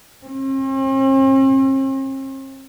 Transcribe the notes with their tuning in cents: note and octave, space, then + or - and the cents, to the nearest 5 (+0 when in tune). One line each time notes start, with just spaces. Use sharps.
C4 +45